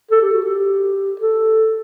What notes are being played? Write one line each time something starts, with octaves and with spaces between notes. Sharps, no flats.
A4
G4
F#4
G4
A4